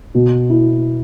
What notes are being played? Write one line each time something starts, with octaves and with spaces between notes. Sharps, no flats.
B2
E4